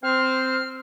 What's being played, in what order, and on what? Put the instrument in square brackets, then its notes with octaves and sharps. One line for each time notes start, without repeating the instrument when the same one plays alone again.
[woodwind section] C4 C5 [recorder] F6